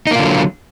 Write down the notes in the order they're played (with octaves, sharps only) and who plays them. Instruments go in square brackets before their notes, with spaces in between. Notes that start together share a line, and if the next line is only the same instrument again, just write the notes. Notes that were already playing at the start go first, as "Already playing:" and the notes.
[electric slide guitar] D#4
A#3
F4
D3
F#3